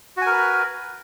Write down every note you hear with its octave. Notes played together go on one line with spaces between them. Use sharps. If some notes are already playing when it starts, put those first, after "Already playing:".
F#4 A#4 B4 G#5